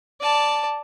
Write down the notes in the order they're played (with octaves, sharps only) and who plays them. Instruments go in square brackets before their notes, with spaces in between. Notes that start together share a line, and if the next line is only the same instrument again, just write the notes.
[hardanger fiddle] D5 A5